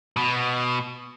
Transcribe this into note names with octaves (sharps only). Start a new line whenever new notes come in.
B2